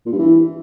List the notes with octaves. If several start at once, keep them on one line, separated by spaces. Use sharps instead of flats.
A#2
G2
E3